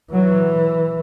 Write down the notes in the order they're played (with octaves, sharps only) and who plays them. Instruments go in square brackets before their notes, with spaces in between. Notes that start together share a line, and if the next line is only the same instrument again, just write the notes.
[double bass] E3 [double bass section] F#3